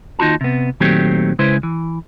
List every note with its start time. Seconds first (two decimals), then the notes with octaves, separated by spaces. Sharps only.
0.19 D#2 D#4 F4 F#4 A5
0.41 C3 B3
0.80 A#2 D#3 F#3 A3 C4 G4
1.39 C#3 G#3 E4 B4 C5
1.63 E3